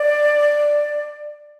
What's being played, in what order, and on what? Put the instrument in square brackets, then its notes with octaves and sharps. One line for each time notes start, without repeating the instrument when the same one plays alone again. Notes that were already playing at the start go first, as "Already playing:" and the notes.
Already playing: [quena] D5